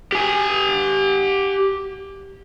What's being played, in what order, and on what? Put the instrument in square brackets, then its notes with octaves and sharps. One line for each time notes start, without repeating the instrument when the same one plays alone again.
[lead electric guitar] G4 G#5